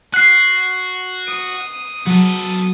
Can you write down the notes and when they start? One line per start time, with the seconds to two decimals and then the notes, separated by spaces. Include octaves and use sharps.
0.14 F#4 F#6 C7
1.28 D#6 C#7
2.06 F#3 B3 A4